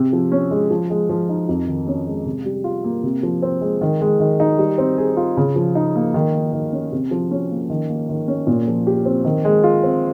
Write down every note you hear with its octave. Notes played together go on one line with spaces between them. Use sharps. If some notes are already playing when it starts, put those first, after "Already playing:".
Already playing: C3
F3
C#4
G#3
F3
G#3
F3
D#4
F2
D#3
C#4
G#3
C3
G3
F4
A#3
C3
F3
C4
G#3
D#3
G#3
D#3
D#4
G3
C4
G#4
F4
C#3
F3
D#4
A#3
D#3
A#3
D#3
C#4
C3
F3
C#4
A#3
D#3
A#3
D#3
C#4
A#2
F3
G4
C4
D#3
G#3
F4
C4